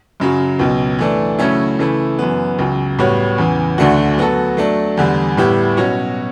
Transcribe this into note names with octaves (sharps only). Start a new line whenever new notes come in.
F#2 C#3 F#3
C#2 B2 F#3
E3 A3 D4
C#3 F#3 A3 C#4 E4
C#3 E3 A3 E4
F#2 E3 B3
C#2 C#3 F#3
A2 G3 B3 F#4 C#5
E2 C#3 E3
D2 D3 A3 D4 F#4
F#3 B3 F#4 A4
F#3 A3 D4
E2 D3 G3
A2 G3 B3 E4 G4
B2 F#3 C#4 F#4 C#5